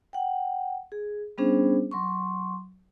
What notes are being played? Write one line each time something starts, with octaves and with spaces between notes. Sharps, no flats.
F#5 G5
G#4
G3 B3 C#4 D4 G#4 C5
F#3 C6 C#6